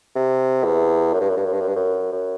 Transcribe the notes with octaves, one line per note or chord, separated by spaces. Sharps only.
C3
E2
F#2
G2
F#2
G2
F#2
G2
F#2
G2
F#2
F#2